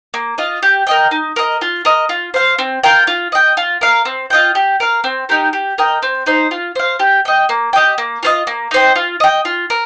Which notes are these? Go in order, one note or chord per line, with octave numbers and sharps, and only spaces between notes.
A#3
F4 D#5
G4
A#4 D#5 G5
D#4
A#4 D#5
F4
A#4 D#5
F4
C5 F5
C4
F4 A#4 G5
F4
D#5 G5
F4
A#4 F5
C4
F4 D#5 G5
G4
A#4 F5
C4
D#4 G4 A#4
G4
A#4 D#5 G5
C4
D#4 C5
F4
C5 F5
G4
D#5 G5
A#3
G4 D#5 G5
A#3
F4 C5 D#5
A#3
D#4 C5 G5
F4
D#5 G5
F4
A#4